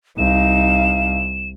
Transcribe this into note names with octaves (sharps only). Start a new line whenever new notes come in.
C2 D#4 F5 E7